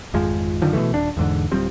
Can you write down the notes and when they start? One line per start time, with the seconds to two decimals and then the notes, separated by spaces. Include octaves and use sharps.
0.14 G#1 F2 F3 G#3
0.62 F#2 D3 D#3 F3
0.73 B2 D3 E3 A3
0.93 D#1 D4
1.17 E2 G#2 D3
1.52 D1 F3 G3 C4